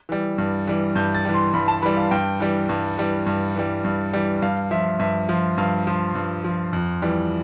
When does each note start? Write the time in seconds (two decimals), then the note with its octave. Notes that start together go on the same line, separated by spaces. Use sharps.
0.09 E3 G3
0.38 G2
0.67 E3 G3
0.96 G2 G6
1.14 A6
1.25 E3 G3
1.34 C6
1.54 G2 B5
1.68 A5
1.82 E3 G3 B5
1.97 F5
2.11 G2 G5
2.40 E3 G3
2.69 G2
2.98 E3 G3
3.26 G2
3.56 E3 G3
3.85 G2
4.13 E3 G3
4.42 G2 F5
4.71 F3 E5
4.99 G2 E5
5.29 F3
5.58 G2 F5
5.87 F3
6.15 G2
6.44 F3
6.73 F2
7.02 E3 G3